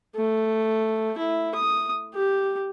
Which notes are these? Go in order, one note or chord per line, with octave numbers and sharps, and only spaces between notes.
A3
E4
D#6
G4